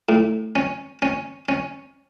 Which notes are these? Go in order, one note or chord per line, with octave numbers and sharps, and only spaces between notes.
A2
C#4
C#4
C#4